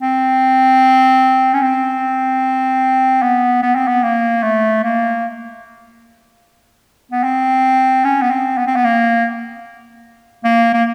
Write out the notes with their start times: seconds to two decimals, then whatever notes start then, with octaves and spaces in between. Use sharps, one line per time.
0.02 C4
1.54 C#4
1.63 C4
3.22 B3
3.62 B3
3.75 C4
3.88 B3
4.03 A#3
4.43 A3
4.84 A#3
7.12 B3
7.24 C4
8.04 C#4
8.22 B3
8.31 C4
8.58 B3
8.67 C4
8.76 B3
8.84 A#3
10.44 A#3
10.73 A#3